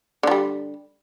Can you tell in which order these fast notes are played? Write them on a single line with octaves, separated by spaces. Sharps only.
D3 F3 G3